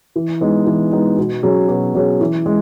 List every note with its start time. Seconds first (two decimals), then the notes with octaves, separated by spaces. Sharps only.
0.16 E3
0.41 G#3 B3 D#4
0.67 E3
0.93 G#3 B3 D#4
1.17 B2
1.43 F#3 C#4 G#4
1.68 B2
1.94 F#3 C#4 G#4
2.21 E3
2.46 G#3